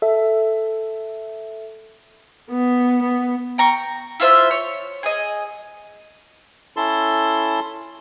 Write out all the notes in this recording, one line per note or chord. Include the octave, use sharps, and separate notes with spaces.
A4 E5
B3
B3
G5 A#5 C#6
E4 F4 C5 E5
C#5
G#4 D#5
C#4 E4 A4 A5 C6